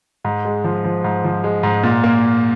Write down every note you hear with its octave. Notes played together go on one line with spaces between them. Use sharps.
G#2
G#3
F3
F3
G#2
F3
G#3
G#2
A#2
A#3